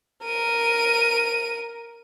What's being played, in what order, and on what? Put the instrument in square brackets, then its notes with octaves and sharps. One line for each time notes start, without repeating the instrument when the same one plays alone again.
[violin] A#4 D#7